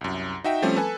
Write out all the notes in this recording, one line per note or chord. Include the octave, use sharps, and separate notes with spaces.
C2 F#2
D#4 F#4 E5 G5
F3 G3 A3 C4 C#4
A4 B4 G#5